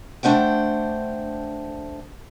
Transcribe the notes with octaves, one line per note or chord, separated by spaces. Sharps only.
A3 D4 C5 F#5 G5